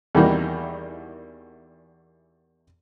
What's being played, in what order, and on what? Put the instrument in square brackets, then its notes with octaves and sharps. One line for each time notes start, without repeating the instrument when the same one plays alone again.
[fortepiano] E2 D#3 E3 G3 A#3 F#4